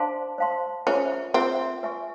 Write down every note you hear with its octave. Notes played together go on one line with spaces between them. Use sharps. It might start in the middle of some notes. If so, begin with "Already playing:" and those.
Already playing: D4 C5 F5 A5 C6
C5 F5 A5 C6
C#4 F4 G#4 C5 E5
C4 F4 G#4 C5 E5
B4 E5 G#5 C#6